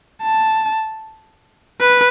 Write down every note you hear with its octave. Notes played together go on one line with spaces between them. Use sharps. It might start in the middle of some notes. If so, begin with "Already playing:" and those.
A5
B4